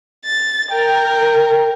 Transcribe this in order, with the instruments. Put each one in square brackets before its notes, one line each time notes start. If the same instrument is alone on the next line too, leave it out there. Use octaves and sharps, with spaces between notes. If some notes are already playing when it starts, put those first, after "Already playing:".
[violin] A6
[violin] A#4 [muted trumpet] G5